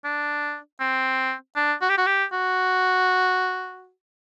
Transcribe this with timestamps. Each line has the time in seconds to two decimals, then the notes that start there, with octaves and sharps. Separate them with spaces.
0.05 D4
0.80 C4
1.56 D4
1.82 F#4
1.89 G4
1.98 F#4
2.07 G4
2.32 F#4